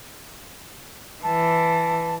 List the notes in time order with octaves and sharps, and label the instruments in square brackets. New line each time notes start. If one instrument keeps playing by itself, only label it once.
[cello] E3 [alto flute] A5